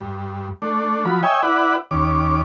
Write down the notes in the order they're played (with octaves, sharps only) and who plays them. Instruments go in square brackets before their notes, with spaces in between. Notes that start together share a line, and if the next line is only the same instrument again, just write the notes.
[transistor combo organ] G2
A3 D4
F3 F#3 B5
C#5 D#5 E5 G5 G#5
E4 B4 D5 F#5
D#2 C#4 D6